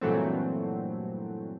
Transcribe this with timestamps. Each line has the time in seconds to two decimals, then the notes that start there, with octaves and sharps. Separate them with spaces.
0.01 G2 A#2 E3 F#3 A3 C4